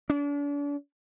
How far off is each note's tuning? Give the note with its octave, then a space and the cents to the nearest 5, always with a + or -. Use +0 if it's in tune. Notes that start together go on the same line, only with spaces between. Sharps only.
D4 -40